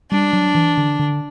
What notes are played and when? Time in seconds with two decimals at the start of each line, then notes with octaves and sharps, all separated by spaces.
0.11 G3 D4
0.33 F#3
0.55 E3
0.77 D3
0.99 D3